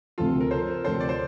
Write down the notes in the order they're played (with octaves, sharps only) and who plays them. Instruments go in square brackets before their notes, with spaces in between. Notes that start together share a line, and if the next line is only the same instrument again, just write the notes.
[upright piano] D2 C3 F3 C4 [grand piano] F4 A4
[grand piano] A#4
A4 C5
[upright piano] D2 C3 F3 C4 [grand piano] A4 C5
[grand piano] D5
C5